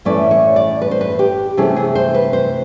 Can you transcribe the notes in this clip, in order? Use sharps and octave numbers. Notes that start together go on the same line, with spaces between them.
A2 E3 A3 C#4 E4 D5
C#5
D5
B4
C5
B4
G4
C3 E3 A3 C#4 E4 G#4
G#4
C5
B4
C5